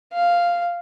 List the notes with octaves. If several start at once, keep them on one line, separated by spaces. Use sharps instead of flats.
F5